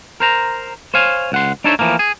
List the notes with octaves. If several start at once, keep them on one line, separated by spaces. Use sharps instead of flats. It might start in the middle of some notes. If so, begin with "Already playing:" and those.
A#4 C5 A#5
C5 C#5 F5 G#5
C#2 F#5 C6
D4 D#4 A4 C5 C#5 E5
E3 F3 A3 A#3
G#4